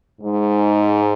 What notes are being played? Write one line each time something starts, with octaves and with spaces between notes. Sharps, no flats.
G#2